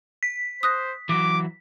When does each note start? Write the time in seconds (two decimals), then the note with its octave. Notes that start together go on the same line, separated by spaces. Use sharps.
0.23 B6
0.63 C5 D#6 F#6 A#6
1.09 E3 F#3 D6